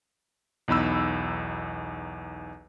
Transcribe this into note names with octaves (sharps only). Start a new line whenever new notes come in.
B1 E2 D#4 B5 E6